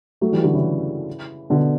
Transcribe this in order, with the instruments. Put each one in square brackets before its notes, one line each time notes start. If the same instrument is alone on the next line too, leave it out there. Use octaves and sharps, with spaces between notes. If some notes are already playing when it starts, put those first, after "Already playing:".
[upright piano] F#3 A3
E3 G3
D3 F#3
C#3 E3
B2 D3